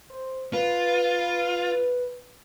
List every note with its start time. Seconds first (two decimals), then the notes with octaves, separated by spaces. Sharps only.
0.10 C5
0.53 F4 B4